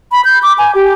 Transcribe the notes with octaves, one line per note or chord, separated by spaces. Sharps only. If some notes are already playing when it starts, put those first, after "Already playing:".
B5
G6
D6
G#5
G4